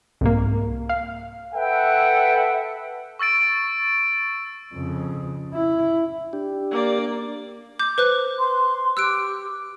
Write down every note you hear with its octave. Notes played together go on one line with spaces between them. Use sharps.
C2 G#2 A#3
F5
A4 B4 E5 F#5 G5
C#6 E6 A6 D7
F2 C#3
E4
D4 G4
A#3 D5
D6 G6
B4 C5 F#6
C6
G4 E6 F#6 D7